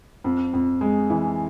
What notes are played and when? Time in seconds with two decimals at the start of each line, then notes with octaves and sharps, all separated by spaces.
0.24 F2
0.53 F2
0.81 G#3
1.10 E3